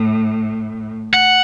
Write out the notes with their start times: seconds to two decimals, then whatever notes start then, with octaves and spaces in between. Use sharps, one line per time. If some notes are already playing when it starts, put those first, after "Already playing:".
Already playing: A2
1.14 F#5